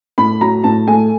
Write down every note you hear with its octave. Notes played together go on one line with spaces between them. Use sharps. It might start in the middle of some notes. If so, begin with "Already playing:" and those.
A2 B5
F#3 A#5
A2 A5
A3 G#5